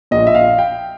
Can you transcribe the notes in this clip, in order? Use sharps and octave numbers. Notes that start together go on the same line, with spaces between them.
A#1 A#2 D#5
E5
F5
G5